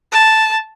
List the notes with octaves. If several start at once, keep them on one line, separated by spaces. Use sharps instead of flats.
A5